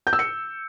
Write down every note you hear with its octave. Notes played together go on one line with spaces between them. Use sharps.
G6
E6
C#7